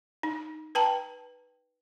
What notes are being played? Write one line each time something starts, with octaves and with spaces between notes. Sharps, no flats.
D#4
B4 G5 A5 A#5